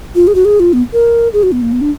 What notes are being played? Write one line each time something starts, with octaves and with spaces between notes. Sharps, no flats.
F4
G#4
F#4
G#4
F4
B3
A#4
G#4
F#4
B3
A#3
B3
D4